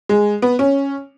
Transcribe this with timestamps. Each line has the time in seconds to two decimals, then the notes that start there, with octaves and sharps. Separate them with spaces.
0.09 G#3
0.42 B3
0.59 C#4